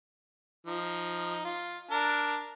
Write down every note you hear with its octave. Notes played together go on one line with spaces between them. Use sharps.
F3 D#4
F4
D4 A#4